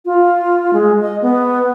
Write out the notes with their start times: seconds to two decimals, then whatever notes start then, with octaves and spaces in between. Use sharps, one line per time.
0.05 F4
0.73 G#3
1.01 D#5
1.22 B3